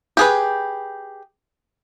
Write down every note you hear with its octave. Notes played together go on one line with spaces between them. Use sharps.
G4 G#4 B4